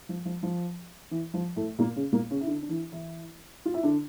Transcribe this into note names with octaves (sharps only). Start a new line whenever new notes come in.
F3
F3
F3
E3
F3
A2 A3
A#2 A#3
C#3 C#4
A#2 A#3
C#3 C#4
E4
D3 D4
D4
E3 E4
E3 E4
F4
E4
D3 D4